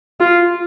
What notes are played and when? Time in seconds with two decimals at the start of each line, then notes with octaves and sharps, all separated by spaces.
0.20 F4